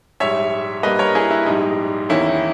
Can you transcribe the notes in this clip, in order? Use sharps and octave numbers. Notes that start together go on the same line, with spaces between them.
A#1 G#2 G3 C#5 E5
G2 G3 A#3 B4 D#5
A#4 C#5
E4 G#4
E4
A#1 G#2 G3 D#4
E2 D#3 A#3 C#4 E4